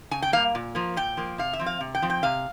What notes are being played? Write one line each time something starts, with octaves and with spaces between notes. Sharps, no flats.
C#3 G#5
G5
G3 A#3 F5
A#2
F3 A#3
A#2 G5
F3 A#3
C3 F5
E5
F3 C4
F5
C3
G5
F3 C4
G5
C3 F5